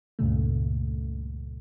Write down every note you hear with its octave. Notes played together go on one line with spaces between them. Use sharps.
C#2 G2 A#2 C#3 A3